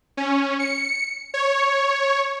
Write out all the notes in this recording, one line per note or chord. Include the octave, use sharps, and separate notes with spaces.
C#4
C#7
C#5